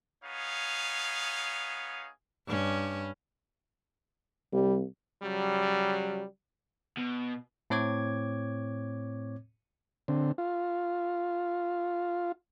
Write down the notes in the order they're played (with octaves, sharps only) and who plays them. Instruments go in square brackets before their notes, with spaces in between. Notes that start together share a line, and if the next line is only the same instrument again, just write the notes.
[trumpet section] B3 D#4 G#4 C#5 F5
[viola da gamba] G2 C#4
[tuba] C2 [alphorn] G3
[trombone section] C#3 F#3 G3
[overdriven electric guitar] B2
[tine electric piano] A2 C4 C#5 D6 G#6
[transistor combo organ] D3 C4
F4